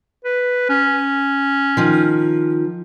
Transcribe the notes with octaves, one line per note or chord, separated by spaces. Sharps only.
B4
C#4
D#3 F3